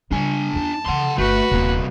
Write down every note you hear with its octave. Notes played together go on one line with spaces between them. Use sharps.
C#3 G3 D4 G#5
E2 A#3 A5
C#3 E3 F#5 C6
G1 D3 A3 F#4 B4
D#1 C2 A#3 B3